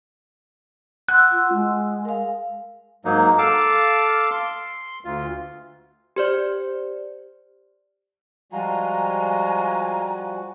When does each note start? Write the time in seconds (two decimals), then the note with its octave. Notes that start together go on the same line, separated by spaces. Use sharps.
1.09 F#5 C6 E6 F#6
1.32 F4
1.53 G#3
2.05 A#4 F5
3.05 G#2 F#3 A#3 D#4
3.38 A4 F5 A5 D6
4.31 C6
5.05 D2 F4
6.16 G4 C5 D5
8.52 F3 G3 G#3 F4 F#4 G#5 A#5